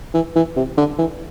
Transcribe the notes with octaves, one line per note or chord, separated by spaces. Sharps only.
E3
E3
C3
D3
E3